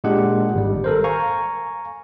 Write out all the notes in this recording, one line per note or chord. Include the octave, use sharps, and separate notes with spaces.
A#2 G#3 D4 G4 F#5
G#1 G3
A4 A#4 C5
F5 G#5 A#5 C#6